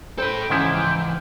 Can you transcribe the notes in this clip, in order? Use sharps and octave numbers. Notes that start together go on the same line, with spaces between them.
A4 C5 G5 B5
G#2 C#3 E3 F3 E4